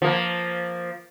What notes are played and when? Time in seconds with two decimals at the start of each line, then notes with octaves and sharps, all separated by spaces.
0.02 F3 A#3